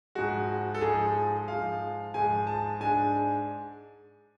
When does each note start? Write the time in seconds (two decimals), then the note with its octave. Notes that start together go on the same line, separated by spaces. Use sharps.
0.15 G#2 F3 G#3 F#4
0.75 A4
0.81 G#2 F3 G#3 G#4
1.48 G#2 F3 G#3 F5
2.14 G#2 F3 G#3 G#5
2.47 A5
2.80 G#2 G#3 D4 G#5